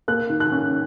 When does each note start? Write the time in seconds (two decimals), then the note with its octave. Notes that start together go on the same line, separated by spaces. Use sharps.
0.08 A#3 F#6
0.30 D#3
0.40 F#6
0.52 C#4